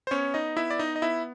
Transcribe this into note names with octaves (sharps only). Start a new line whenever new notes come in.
C5
B3 C#4 C#5
D#4 D#5
B3 E4 E5
D5
D#4 D#5
D#5
B3 E4 E5